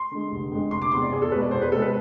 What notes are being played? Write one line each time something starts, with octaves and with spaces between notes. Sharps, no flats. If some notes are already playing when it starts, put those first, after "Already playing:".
Already playing: C6
D3 G#3
F1
F2 D3 G#3
F1 C6
D6
E2 C3 C6
D5
E2 G#4
A4
B2 G#3 B4
D5
E2 C5
B4
C3 G#3 A4
B4